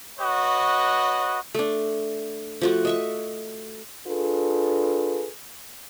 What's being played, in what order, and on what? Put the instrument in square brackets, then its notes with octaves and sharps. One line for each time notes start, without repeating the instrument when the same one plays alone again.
[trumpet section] F#4 B4 C#5 D#5
[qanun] A3 D4
F3 A3 F#4
D#5 E5 C#6
[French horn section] D4 F4 G#4 A4 B4